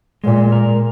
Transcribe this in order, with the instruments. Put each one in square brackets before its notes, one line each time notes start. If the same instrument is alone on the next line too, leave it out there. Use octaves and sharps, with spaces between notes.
[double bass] A#2 [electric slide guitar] G#3
[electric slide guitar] A#4